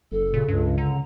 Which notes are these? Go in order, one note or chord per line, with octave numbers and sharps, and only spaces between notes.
F#1 A4
A#2 C#3
C#2 G2 C#3
D3 A#5